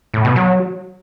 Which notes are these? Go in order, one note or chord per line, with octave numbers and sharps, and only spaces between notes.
A2
B2
F#3